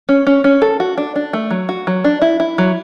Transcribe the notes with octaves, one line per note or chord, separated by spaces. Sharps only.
C#4
C#4
C#4
A4
F#4
D4
D4
A3
F#3
F#4
F#3
D4
E4
E4
F#3